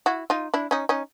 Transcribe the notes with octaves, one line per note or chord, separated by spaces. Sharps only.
E4 F#4
D#4 F4
D4 E4
C#4 D#4
C#4 D#4